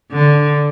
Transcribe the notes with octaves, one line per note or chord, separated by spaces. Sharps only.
D3